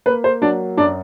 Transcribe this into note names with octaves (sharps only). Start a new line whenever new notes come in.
A#3 B4
C5
F#3 D4 D5
F#2 D4 D5